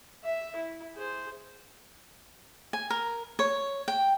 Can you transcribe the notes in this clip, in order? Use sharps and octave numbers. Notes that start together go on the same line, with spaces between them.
E5
E4
G#4 C5
G#5
A#4
C#5
G5